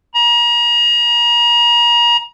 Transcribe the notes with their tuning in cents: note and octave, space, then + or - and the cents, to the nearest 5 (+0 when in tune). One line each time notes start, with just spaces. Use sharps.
A#5 +35